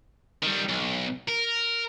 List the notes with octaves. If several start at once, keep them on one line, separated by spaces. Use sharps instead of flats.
D#3 G3
B1
A#4